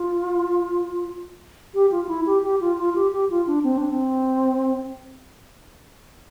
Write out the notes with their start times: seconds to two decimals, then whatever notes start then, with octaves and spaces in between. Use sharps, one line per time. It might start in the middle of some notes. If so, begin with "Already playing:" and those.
Already playing: F4
1.74 G4
1.91 F4
2.04 F4
2.09 E4
2.26 G4
2.44 G4
2.61 F4
2.78 F4
2.95 G4
3.13 G4
3.30 F4
3.47 D4
3.64 C4
3.78 D4
3.91 C4